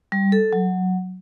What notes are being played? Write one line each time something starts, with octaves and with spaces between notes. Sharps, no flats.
G3
A4
F#3